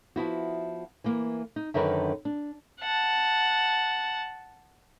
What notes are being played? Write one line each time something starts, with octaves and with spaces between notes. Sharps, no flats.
F3 B3 E4 F#4
E3 A#3
D#4
F#2 D3 D#3 A#4 B4
D4
F#5 A5